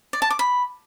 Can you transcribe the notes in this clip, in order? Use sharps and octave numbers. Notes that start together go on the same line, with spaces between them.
D5
A5
D6
B5